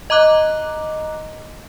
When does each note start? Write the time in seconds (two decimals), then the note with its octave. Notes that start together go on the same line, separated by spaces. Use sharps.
0.10 D#5 A#5 D6 F#6